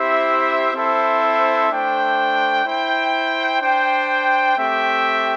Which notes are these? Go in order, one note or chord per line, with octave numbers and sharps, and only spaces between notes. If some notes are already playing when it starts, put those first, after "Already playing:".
Already playing: C4 E4 G4 C5 E5
C4 E4 A4 C5 E5
A3 D4 C5 G5
E4 C5 G5
D4 C5 G5
A3 C4 G4 E5 G5